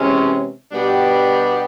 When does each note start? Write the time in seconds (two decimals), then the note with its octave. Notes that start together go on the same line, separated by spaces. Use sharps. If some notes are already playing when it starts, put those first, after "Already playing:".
Already playing: C3 E3 G#3 C#4
0.71 B2 G3 B3 D4 G4